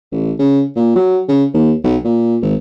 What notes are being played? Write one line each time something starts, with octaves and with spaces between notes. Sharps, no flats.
A1
C#3
A#2
F#3
C#3
D#2
B1
A#2
G#1